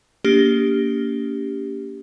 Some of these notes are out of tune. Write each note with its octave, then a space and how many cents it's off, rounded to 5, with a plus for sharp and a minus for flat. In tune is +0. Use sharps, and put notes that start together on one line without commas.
A#3 +0 D4 -45 G4 +0